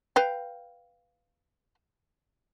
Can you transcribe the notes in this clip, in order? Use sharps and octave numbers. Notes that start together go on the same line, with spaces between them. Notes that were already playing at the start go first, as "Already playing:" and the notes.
B4 F5 G5